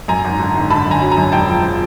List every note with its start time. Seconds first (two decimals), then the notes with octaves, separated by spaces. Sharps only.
0.08 F#2 G#5 A#5
0.24 G#1
0.40 D3
0.55 G#1
0.70 D3 A5 B5
0.86 F#2 G#5 A#5
1.01 F#3
1.11 G#5 A#5
1.18 F#2
1.32 E1 G5 A5
1.47 F3
1.63 F3